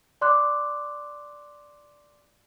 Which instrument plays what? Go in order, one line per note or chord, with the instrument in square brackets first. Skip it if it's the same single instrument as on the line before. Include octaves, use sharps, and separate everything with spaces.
[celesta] D5 C6 D6 F#6